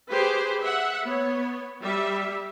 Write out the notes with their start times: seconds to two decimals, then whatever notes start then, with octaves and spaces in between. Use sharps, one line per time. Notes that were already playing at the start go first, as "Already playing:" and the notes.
0.12 G4 G#4 B4 C5
0.63 E5 F#5
1.04 B3 C#5
1.82 G3 E5